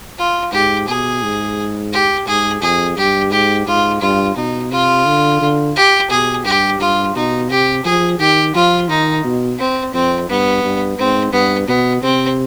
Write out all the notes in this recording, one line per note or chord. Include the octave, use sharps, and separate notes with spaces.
F4
G#2 G4
B2 G#4
G#2
G4
G#2 G#4
F2 G#4
G2 G4
G#2 G4
G#2 F4
G2 F4
B2 D#4
C3 F4
D3
D3
G4
B2 G#4
G2 G4
G2 F4
B2 D#4
C3 G4
F3 G#4
D#3 G4
F3 F4
D#3 D#4
B2
C4
F2 C4
G2 B3
G2
G#2 C4
G2 B3
B2 B3
C3 C4